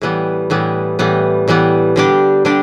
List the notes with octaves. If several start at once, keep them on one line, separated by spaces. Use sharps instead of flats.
A2 E3 G3 B3
A2 E3 G3 B3
A2 E3 G3 B3
A2 E3 G3 B3
D3 G3 D4 G4
D3 G3 D4 G4